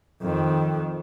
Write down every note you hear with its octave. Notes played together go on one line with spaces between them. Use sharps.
F2 D#3